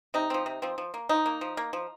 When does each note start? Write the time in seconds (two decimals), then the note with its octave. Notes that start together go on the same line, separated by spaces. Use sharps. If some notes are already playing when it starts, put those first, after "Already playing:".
0.14 C3 D#4
0.30 F3 C4
0.46 C3
0.62 F3 C4
0.78 F3
0.94 A#3
1.09 F3 D#4
1.26 A#3
1.41 F3
1.57 A#3
1.73 F3